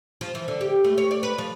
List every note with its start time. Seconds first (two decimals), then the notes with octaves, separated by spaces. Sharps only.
0.21 F3
0.35 E3
0.48 D3
0.61 G4
0.84 A3
0.98 C#5
1.11 D5
1.23 B4
1.38 F3